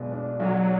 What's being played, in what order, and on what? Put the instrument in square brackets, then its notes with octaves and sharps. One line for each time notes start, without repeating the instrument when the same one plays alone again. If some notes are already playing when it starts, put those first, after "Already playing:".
Already playing: [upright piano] B1 B2 G#3 D4
D4
[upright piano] B1 [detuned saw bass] F#3